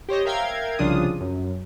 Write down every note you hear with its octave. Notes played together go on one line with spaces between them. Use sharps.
G4 C5 C#5 D#5
A#4 E5 F5 G5 A#5 G#6
C2 C#3 F3 D4 F4 D#6
F#2